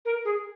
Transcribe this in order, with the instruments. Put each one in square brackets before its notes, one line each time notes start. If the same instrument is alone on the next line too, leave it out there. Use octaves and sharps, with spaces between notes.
[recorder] A#4
G#4